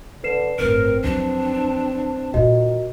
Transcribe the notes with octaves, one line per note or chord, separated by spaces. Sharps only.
D3 B4 C7 E7
G1 A2 C4 A#4
F2 F#3 D4
A#2 D#3 F4 F#4 D#5